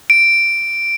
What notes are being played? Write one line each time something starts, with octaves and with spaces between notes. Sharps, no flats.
D7